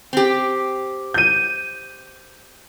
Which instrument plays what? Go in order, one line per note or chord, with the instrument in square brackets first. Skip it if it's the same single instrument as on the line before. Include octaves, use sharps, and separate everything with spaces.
[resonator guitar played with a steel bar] C4 G4
[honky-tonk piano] G6 D#7